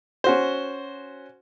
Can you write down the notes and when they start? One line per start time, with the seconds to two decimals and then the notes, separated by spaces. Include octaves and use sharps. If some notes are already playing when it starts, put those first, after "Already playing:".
0.24 C#4 F#4 C5